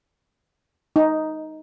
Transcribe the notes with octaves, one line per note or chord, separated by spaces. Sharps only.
D#4